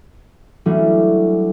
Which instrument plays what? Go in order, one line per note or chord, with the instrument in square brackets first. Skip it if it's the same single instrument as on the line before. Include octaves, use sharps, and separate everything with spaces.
[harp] E3 F#3 G3 A3 C#4 D4